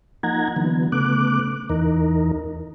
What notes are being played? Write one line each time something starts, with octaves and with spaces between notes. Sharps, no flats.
F3 A#3 D#4 F#5 A#5 G#6
D3 E3 F#3 B3
C#3 A3 B3 D6 F#6
E2 E3 D#4 A#4